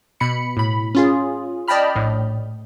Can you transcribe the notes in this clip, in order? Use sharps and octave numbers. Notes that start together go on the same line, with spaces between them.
B2 B5 C#7
A2 B5
C#4 F4 G#4
D5 D#5 G5 A5 B5 F6
A#1 A2